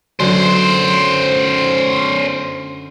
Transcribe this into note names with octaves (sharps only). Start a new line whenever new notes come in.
F#2 D3 C#4 C5